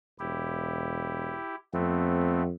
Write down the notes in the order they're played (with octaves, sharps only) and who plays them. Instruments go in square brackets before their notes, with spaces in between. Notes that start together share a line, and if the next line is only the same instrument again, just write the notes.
[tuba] E1 [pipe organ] E4 G4
[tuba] F2 [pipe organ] A3 B3 C4